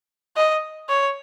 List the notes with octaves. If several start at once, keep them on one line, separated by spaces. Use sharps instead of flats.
D#5
C#5